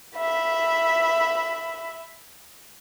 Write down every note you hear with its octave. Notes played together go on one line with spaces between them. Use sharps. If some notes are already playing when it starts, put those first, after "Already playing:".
E5 B5